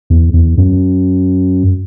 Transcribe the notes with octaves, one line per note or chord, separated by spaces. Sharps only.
E2
E2
F#2